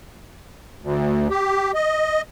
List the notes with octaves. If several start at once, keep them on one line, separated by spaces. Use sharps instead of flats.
D2
G4
D#5